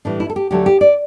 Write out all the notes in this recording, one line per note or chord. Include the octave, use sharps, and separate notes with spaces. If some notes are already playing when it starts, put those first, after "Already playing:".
A2 E3 G3 D4
E4
A4
G4
D2 D3 F#3 A3 G4
G4
D5